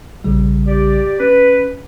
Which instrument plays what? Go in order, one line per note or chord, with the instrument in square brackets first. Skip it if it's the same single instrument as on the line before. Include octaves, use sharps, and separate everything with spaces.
[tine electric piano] A#1 C#3 G3
[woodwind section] G4 D5
[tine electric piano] C#4 [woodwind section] B4